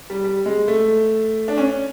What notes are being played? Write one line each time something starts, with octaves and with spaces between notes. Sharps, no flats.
G3
G3
G#3
A3
D4
C#4